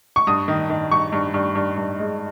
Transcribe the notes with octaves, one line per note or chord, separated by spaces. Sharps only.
C#6
G2 D#6
D#3
D#3
G2 C#6
G2
G2
G2
G2
G#3